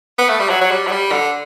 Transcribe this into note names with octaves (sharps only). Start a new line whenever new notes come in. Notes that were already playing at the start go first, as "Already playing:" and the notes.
B3
A3
G3
F#3
F#3
G3
F#3
G3
D3